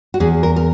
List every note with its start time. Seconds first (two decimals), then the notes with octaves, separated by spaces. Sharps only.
0.14 F#4
0.20 E2 G#4
0.43 A#4
0.56 A#4